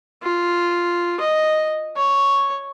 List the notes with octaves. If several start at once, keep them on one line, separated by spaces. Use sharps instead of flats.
F4
D#5
C#5